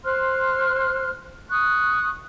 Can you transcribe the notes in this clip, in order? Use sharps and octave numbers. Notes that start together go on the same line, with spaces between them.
C5 C6 F6 F#6
C#6 D#6 F#6